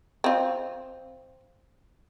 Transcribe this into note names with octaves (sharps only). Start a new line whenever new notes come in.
C4 F4